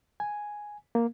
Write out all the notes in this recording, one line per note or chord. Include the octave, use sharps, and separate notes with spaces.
G#5
A#3